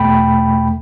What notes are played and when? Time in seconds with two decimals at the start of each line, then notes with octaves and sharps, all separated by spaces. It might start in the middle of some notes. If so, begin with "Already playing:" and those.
Already playing: E2 B2 A3 G5 B5